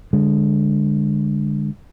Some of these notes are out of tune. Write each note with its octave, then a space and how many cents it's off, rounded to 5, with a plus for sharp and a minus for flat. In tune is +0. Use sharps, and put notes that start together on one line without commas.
D3 +0 G#3 -20